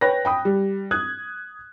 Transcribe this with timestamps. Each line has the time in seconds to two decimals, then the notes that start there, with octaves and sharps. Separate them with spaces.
0.01 B4 C#5 G5 B5 F#6 A#6
0.25 G5 B5 D#6
0.45 G3
0.91 D#6 F#6 G#6